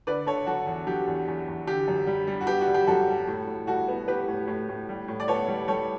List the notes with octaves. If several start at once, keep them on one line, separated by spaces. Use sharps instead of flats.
D3 B4 D5
D3 A4 C#5
F#3 F#4 A4
E2
F#3 G4
E2
E2
E2
D3 G4
F#2
G3
G3
F#4
B3 G4
F#4
G3
G4
F#2 F#4 A4
G3
A2
A2
G3 F#4 A4
B3
B3 G4 B4
A2
A2
A2
G3
A2
D5
B3 A4 C#5
G3
G3 A4 C#5